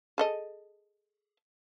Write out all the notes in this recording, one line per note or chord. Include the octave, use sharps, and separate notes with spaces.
G#4 A4 D#5